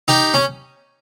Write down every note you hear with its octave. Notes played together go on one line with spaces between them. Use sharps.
D#4 G4
C#4